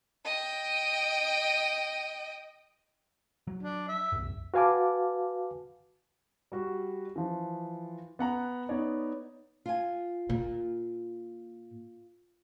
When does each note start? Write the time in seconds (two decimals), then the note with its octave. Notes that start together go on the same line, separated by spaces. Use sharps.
0.25 D#5 G5
3.47 F#3
3.63 D4
3.88 E5
4.12 C2 F#2
4.54 F#4 B4 F5 G#5 A5 D6
6.52 G3 F#4
7.16 E3 F3
8.19 B3 F#5 A#5
8.69 B3 D#4 C#5 D5
9.66 F4 G#5
10.29 A#2